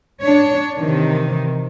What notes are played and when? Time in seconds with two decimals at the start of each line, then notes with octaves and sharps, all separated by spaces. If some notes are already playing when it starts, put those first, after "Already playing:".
0.24 D4 C#5
0.78 C3 D#3 E3